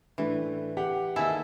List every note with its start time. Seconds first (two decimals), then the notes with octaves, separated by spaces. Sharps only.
0.18 A2 E3 A3 D4
0.77 G4 F#5
1.16 D#2 E4 G#4 A4 D#5 E5 A5